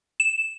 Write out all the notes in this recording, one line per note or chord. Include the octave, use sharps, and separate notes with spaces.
E7